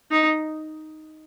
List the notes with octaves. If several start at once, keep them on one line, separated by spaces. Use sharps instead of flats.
D#4